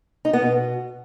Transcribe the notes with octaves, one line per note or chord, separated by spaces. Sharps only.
D#4
B3
B2